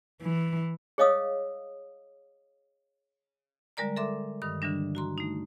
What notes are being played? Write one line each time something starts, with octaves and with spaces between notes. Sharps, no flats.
E3
G#4 C#5 D#5 F5 D#6 E6
D3 G3 G#3 A#4 D5 A#5
A4 A#4 E5 C6 D6
G2 D#3 D#6
D3 E3 G3 D4
F#4 A#5 C6
A3 D#4